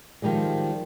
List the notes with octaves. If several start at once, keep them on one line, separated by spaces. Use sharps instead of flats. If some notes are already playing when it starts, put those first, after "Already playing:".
D#3 F3 G3 G#3